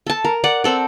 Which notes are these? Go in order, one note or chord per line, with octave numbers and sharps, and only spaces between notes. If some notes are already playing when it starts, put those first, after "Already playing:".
A4 A5
A#4
D5 F#5
C4 A4 D5